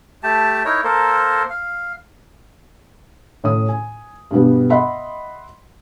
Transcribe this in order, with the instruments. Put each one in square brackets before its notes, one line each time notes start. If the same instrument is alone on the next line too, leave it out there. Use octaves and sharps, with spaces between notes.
[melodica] A3 G4 A5
D#4 E4 A#4 C#5
A#3 A4 A#4 C5
F5
[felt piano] A2 C#3 D#6
G#5
G2 B2 G3 B3
D#5 E5 F#5 B5 C6